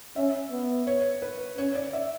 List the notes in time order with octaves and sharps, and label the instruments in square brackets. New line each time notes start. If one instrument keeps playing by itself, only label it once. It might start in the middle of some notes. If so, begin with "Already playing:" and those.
[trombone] C#4 [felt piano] E5
[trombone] B3
[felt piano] C#5
B4
[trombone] C#4 [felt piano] C#5
[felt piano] D5
E5